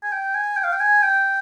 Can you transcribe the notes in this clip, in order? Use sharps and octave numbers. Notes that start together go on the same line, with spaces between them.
G#5
G5
G#5
G5
F5
G5
G#5
G5